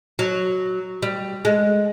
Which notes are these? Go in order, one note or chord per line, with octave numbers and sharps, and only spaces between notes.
F#3
G3
G#3